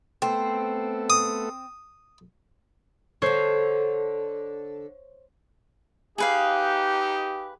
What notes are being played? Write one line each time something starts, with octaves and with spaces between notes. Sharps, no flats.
A3 B3 C4 A4
D#6
D3 A4 C5 C#5
D#4 G4 G#4 B4 F5